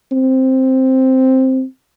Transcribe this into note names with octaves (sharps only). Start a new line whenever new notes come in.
C4